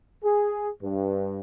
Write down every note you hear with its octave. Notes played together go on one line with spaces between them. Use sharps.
G#4
G2